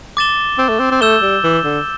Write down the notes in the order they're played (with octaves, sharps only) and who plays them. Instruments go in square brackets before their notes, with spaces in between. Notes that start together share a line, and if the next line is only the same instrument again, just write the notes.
[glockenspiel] D6 A6 E7 G7
[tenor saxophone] C4
A3
C4
C4
[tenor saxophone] A3 [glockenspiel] E6 G6 E7 G7
[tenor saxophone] G3
E3
D3